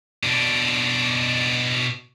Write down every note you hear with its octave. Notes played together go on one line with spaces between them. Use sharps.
B2 D4